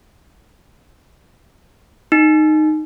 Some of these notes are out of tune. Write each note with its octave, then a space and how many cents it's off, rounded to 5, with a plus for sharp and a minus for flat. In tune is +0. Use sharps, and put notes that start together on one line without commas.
D#4 -10